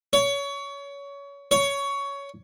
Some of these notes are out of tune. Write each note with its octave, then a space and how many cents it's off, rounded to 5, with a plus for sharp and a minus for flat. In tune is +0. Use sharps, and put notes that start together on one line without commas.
C#5 +25
C#5 +15